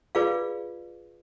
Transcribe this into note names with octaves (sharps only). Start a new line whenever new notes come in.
F4 G#4 B4 D5 F5